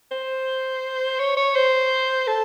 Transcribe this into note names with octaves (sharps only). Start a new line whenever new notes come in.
C5
C#5
C#5
C5
A4